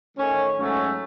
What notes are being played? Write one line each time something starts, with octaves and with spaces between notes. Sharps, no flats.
D#3 A3 C#4
G#2 F#3 A3 C#4